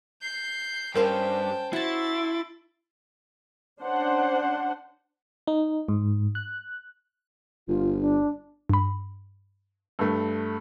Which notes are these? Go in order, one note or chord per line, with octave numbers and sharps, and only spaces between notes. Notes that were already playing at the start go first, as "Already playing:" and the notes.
G6 C7
G2 C#4 A#4 C5 F5 G5 A5
E4 F#4 A5 C6 A6
C#4 D4 C5 F#5
D#4
G#2
F#6
G1 F4
D4
G2 B5
G2 A3